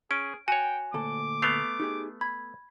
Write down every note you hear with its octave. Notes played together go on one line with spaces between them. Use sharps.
C#4 G#4 D7
F#4 C#5 G5 G#5
D2 A#2 A4 D6
A3 B3 C7 F7
D#4 G4 G#4
B5 G#6